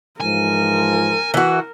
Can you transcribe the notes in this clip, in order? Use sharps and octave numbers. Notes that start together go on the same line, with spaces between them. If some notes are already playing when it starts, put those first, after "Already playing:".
G#2 E3 F3 A#4 G#5
E3 F#4